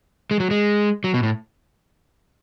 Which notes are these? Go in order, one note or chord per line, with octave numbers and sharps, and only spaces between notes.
G#3
F#3
G#3
F#3
B2
A2